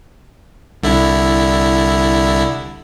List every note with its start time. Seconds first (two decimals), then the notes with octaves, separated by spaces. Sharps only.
0.83 C2 D3 E4